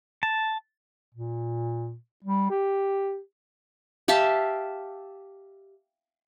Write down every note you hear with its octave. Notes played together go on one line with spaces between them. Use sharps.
A5
A#2
G3
G4
G4 E5 F5 A5